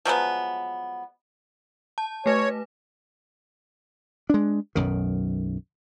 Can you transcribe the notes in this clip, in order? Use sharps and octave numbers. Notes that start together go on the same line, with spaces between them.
F3 F#3 G#3 B3
A5
A3 B4 C#5
G#3 D4
B1 F#2 D#3